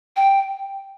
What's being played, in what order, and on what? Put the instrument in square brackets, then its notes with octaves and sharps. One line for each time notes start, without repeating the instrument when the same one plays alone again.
[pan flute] G5